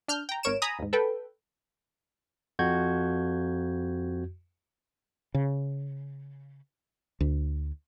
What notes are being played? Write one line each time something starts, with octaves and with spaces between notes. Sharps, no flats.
D4 F6 G6
G5 A#5
G#1 A#4 C#5 D7 E7
G#5 A#5 B5 D#6
D#2 G#2
A4 B4 G5
F2 F#4 G6 G#6
C#3
D2